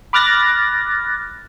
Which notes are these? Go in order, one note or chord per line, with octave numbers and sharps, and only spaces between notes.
B5 D6 F6 F#6 A6 A#6